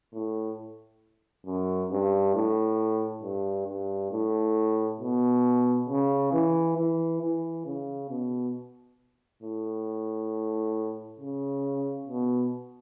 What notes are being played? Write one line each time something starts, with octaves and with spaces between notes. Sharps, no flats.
A2
F#2
G2
A2
G2
G2
A2
B2
C#3
E3
E3
E3
C#3
B2
A2
C#3
B2